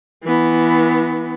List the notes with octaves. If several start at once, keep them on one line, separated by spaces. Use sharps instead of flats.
E3 B3